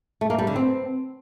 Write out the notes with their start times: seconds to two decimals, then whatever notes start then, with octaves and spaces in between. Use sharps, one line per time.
0.21 A3
0.30 A#3
0.38 G3
0.47 D3
0.56 C4